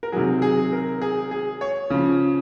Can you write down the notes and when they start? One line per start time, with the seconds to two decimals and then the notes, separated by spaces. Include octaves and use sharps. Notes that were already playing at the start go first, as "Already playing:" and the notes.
0.03 A#4
0.12 C3 D#3 F#3 G#4
0.42 G#4
0.72 A#4
1.02 G#4
1.31 G#4
1.61 C#5
1.90 C#3 F3